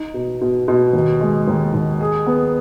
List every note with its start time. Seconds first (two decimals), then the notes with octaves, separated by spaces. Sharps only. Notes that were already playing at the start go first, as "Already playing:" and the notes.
Already playing: D#4
0.14 B2
0.41 B2
0.68 B2
0.93 D#2
1.20 G#3
1.48 D#2
1.73 D#2
2.01 G#4
2.27 B3